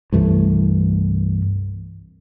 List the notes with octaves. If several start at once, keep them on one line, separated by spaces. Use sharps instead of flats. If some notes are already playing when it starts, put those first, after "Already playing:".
C2 G2 E3 A3